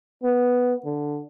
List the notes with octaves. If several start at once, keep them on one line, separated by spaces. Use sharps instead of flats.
B3
D3